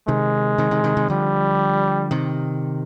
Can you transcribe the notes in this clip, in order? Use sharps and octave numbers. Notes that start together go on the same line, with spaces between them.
C3 D#3 G#3
C3 D#3
C3 D#3
C3 D#3
C3 D#3
D3 F3 G3
C3 D#3